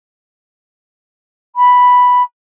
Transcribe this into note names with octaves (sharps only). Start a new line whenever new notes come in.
B5